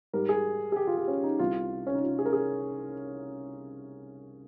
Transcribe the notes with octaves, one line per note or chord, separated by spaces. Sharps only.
G#2 G3 A#4
G#4
G#4
G4
F4
G4
C#4
D#4
C2 C3 G3 F4
C#4
D#4
F4
G#4
A#4
G#4